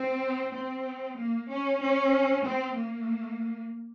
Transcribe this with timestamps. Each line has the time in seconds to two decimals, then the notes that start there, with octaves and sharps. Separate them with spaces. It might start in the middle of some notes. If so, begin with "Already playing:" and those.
Already playing: C4
0.54 C4
1.18 A#3
1.49 C#4
1.81 C#4
2.45 C4
2.76 A#3